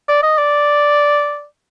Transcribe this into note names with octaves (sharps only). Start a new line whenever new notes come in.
D5
D#5
D5